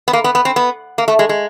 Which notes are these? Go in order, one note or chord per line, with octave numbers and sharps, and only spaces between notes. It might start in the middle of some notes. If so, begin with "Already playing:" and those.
B3
A#3
B3
B3
C4
B3
A#3
A3
G#3
G#3